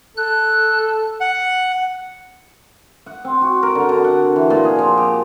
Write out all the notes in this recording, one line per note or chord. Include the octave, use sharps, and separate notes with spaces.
A4 F#6
F#5
F#5
C4
F#4
A#4
D3
D3
F#5
E3
A#2
G#4
F3
G4